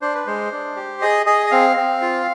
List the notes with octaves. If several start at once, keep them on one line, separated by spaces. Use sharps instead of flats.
D4 C5
B4
G#3 C5
D4
G4
G#4 D#5
G#4 D#5
D#5
C4 F5
C4
F4